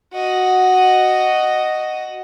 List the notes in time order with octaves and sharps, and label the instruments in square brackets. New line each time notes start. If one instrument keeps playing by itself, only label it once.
[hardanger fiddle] F#4 D#5